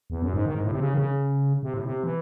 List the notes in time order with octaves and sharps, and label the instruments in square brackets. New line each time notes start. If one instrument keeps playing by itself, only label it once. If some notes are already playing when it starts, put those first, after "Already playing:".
[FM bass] E2
F#2
G#2
D#3
G#2
A2
C3
C#3
D#3
C#3
C3
A2
C3
E3